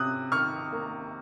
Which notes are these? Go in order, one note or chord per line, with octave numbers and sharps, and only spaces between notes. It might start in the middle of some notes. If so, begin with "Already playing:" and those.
Already playing: C3 C#4 D#6 F#6
D#3 C#6 F6
A#3